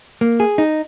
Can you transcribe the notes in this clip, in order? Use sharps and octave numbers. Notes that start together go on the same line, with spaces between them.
A#3
G#4
D#4